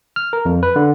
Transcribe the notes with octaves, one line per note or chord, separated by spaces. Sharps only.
F6
A#4
F2
B4
D3